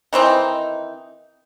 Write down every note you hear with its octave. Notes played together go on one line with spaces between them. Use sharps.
D#3 E3 C4 D#4